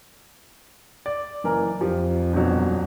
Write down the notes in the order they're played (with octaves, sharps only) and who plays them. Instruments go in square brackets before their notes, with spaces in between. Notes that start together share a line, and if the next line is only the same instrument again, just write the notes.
[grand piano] D5
[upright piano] F#1 E3 A#4
[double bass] F2 [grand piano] F3 [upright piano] G4
[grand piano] D#1 F#3 [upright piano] G2 B2